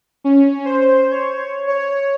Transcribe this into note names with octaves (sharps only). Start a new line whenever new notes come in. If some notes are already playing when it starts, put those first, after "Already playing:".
C#4
C5
C#5
C#5